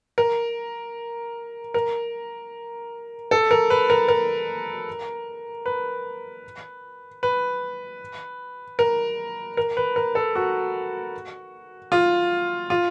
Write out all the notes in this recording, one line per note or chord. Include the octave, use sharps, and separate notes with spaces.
A#4
A#4
A4
A#4
B4
A#4
A#4
B4
B4
A#4
A#4
B4
A#4
A4
F#4
F4
F4